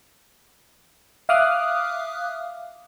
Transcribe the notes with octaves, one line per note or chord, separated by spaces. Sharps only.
E5 F5 D6 D#6 F6 F#6